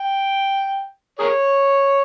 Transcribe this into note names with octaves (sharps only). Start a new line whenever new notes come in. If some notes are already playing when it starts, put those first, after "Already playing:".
Already playing: G5
G#4 A#4 C#5